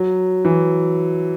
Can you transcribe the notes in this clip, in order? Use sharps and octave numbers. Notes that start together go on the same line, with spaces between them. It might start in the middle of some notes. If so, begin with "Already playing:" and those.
Already playing: F#3
E3